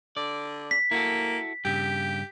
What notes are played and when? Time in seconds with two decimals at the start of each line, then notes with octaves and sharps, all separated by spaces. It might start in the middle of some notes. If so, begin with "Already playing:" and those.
0.17 D3 D5
0.71 B6
0.91 A#3 E4 F#4 A4
1.65 G2 C#3 G4